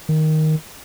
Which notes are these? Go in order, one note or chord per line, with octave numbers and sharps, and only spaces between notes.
D#3